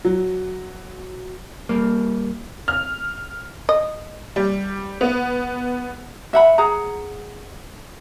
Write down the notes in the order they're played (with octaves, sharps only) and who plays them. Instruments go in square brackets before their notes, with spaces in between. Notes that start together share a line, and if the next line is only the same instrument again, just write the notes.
[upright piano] F#3
[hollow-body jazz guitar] G3 A#3
[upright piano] F6
[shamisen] D#5
[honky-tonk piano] G3
B3
[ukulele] E5 F#5 B5
G#4 F#5 A#5